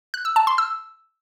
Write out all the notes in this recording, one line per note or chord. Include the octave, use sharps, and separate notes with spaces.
F#6
E6
A5
C6
E6